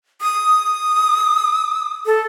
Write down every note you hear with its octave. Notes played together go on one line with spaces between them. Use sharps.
D#6
A4